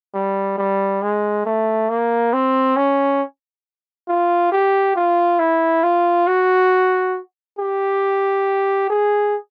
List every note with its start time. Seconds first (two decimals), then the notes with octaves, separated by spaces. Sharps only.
0.14 G3
0.58 G3
1.02 G#3
1.45 A3
1.89 A#3
2.33 C4
2.76 C#4
4.08 F4
4.52 G4
4.96 F4
5.39 E4
5.83 F4
6.27 F#4
7.59 G4
8.90 G#4